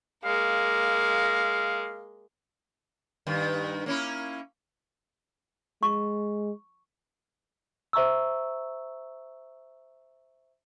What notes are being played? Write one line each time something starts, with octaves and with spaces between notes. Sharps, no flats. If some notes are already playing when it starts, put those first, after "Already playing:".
G#3 A#3 F5
G2 D#3
A#3 C#4 E4
G#3 C#6
C5 E5 A#5 C#6 E6